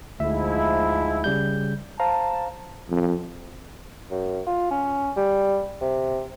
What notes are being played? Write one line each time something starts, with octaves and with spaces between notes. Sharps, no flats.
D2 G#2 F3 E4 E5
C#3 G3 G6
C5 F5 A5 A#5
F2
F#2
F4
C#4
G3
C3